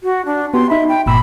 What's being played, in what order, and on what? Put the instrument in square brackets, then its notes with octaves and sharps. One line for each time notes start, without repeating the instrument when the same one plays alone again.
[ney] F#4
D4
[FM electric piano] B3 F#4 G4 [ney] C6
[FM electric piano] D#4 B5 [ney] E5
[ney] G5
[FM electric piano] G1 A#2 E6 [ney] B5